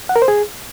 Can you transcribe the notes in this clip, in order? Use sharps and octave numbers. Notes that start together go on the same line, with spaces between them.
F#5
A#4
C5
G#4